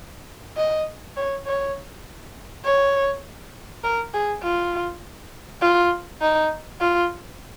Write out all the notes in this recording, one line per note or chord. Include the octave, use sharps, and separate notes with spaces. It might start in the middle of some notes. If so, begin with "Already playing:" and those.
D#5
C#5
C#5
C#5
A#4
G#4
F4
F4
D#4
F4